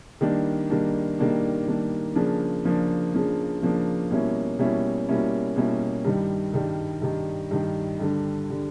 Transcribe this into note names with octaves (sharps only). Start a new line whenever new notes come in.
D#3 G3 A#3 D4
D#3 G3 A#3 D4
D#3 G3 A#3 D4
D#3 G3 A#3 D4
C#3 F3 A#3 D4
C#3 F3 A#3 D4
C#3 F3 A#3 D4
C#3 F3 A#3 D4
B2 G3 A#3 C#4 E4
B2 G3 A#3 C#4 E4
B2 G3 A#3 C#4 E4
B2 G3 A#3 C#4 E4
G2 D#3 G3
G2 D#3 G3
G2 D#3 G3
G2 D#3 G3
G2 D3 G3
D3 G3